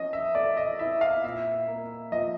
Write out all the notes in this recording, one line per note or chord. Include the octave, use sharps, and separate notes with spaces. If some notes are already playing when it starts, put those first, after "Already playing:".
Already playing: F3 C#4 D#5
E5
A3 D5
D#5
E4 E5
F5
A#2 E5
A#3
F3 D#5